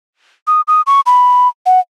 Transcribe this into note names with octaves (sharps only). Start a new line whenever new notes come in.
D#6
D#6
C#6
B5
F#5